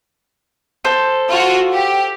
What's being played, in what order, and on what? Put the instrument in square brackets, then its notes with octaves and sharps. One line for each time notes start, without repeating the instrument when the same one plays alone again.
[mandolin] A4 C5
[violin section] F4 F#4
G4